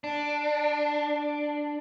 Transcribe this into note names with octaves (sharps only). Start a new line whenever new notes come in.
D4